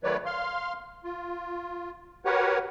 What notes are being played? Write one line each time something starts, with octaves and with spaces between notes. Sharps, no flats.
D#3 F#3 A3 B4 C#5 D5
F5 C6 F6
F4
F#4 G4 A#4 B4 C#5 F#5